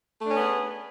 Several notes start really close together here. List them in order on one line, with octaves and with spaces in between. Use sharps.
A3 D4 C#4 B3 G#4